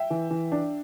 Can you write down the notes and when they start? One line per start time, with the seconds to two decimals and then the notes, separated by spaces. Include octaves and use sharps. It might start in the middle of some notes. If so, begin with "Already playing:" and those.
Already playing: E5 G5
0.10 E3
0.30 E3
0.52 D4